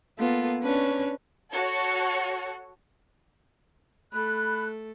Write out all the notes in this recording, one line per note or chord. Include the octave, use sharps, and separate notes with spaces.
A#3 B3 F4 A4
C#4 D4 B4 C#5
F#4 A4 C#5
A3 A4 B5 F#6